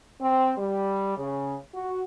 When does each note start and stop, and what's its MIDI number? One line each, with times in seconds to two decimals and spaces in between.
0.22 0.54 60
0.57 1.14 55
1.16 1.55 49
1.74 2.01 66